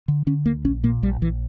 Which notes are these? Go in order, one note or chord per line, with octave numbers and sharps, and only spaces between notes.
D3
D3 C#4
D2 A#3
A#1 C#4
A#2 A#3
A#1 G3
A#1 E3